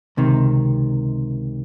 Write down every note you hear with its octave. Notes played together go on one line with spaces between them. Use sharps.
C#2 C3 D#3